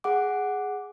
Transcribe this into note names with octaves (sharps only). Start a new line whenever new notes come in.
G#4 F#5 D6